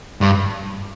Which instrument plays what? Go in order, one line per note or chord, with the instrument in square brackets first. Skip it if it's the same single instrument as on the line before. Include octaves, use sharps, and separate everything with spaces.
[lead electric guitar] G2